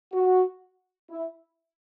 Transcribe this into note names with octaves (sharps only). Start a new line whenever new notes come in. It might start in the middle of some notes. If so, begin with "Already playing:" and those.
F#4
E4